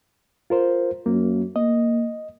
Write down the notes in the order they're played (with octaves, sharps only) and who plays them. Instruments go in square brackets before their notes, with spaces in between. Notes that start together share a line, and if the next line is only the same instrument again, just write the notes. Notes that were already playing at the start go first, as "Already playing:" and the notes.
[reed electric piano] F4 A#4 C5
[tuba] F#2 [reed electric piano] A#3
[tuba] A#3 [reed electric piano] D#5